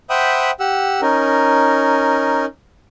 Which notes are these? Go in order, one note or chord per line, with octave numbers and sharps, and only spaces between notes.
C5 E5 F#5 G5 B5 D#6
G4 F#5 E6
C#4 D#4 A#4